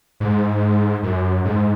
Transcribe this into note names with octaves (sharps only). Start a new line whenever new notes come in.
G#2
F#2
G#2